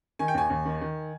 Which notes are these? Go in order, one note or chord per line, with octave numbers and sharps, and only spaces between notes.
D#3 G#5
G5
D#2 G#5
D#2
D#3
D#3